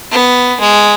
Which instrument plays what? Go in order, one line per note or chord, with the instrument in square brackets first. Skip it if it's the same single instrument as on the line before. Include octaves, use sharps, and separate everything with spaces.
[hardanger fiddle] B3
G#3